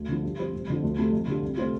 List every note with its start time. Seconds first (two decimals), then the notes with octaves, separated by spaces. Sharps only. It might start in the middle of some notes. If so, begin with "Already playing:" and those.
Already playing: D2
0.08 D3 F3
0.23 G2
0.38 F3 C4 G4
0.53 F1
0.68 F2 D3 F3
0.83 D2
0.97 C3 A3 F4
1.12 F2
1.27 D3 G3 F4
1.42 C2
1.57 C3 A3 C4 F4